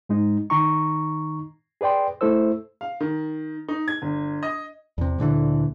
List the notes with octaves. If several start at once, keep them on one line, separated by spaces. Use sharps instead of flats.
G#2 G#3 D#4
D#3 D#4 A#5 C#6
G#4 B4 D5 G5 C6
A3 E4 A4 C5 E6
F5
D#3
D#4
G#6
G1
D#5
E2 C3
D2 A#2 D3 E3